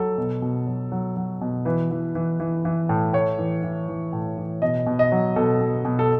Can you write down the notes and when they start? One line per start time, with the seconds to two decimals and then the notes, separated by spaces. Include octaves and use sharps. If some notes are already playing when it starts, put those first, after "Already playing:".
Already playing: F#3 A4
0.18 B2
0.42 B2
0.67 F#3
0.92 F#3
1.17 F#3
1.41 B2
1.65 E3 B4
1.91 E3
2.15 E3
2.40 E3
2.65 E3
2.89 A2
3.13 A2 C#5
3.39 E3
3.63 E3
3.88 E3
4.13 A2
4.38 E3
4.62 B2 D#5
4.86 B2
4.99 D#5
5.12 F#3
5.36 B2 A4
5.61 B2
5.85 B2
5.99 A4